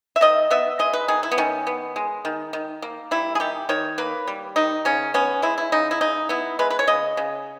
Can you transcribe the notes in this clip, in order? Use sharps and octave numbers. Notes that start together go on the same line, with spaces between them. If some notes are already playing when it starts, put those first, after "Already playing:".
E5
D#3 D#5
B3 E5
G#3 D#5
B4
D#3 G#4
E4
B3
D#3 C#4
B3
G#3
D#3
D#3
A#3
G3 E4
G#4
D#3 G4
D#3 C#5
A#3 B4
G3
D#3 D#4
C#3 C#4
B3 C#4
G#3 E4
E4
C#3 D#4
E4
C#3 D#4
B3 E4
G#3 B4
B4
C#5
C#3 D#5
C#3